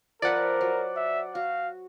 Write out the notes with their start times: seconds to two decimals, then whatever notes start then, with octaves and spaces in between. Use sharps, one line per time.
0.22 F3 A#4 B4 D5 F#5
0.61 F#3
0.96 E5
1.35 F#4 F5